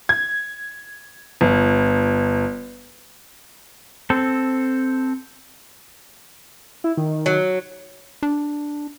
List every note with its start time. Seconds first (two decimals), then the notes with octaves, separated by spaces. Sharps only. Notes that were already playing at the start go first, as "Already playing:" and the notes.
0.09 G#6
1.41 G1
4.10 C4 A4
6.84 E4
6.97 D#3
7.26 F#3
8.23 D4